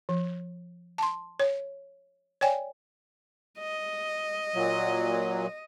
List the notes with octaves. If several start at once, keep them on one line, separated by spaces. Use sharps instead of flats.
F3
A5 C6
C#5
C#5 D5 G5 G#5
D#5
A#2 F#3